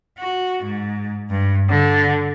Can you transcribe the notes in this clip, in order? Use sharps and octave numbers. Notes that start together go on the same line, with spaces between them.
F#4
G#2
G2
D3